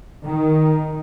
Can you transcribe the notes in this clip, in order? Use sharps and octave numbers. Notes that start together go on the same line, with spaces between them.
D#3